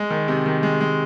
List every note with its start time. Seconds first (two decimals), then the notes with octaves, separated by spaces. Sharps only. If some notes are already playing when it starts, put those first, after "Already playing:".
Already playing: G#3
0.10 D#3
0.28 C3
0.46 D#3
0.63 G#3
0.80 G#3